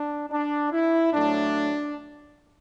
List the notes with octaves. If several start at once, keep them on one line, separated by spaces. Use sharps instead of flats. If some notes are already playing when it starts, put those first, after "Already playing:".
Already playing: D4
D4
E4
A2 F#3 A3 D4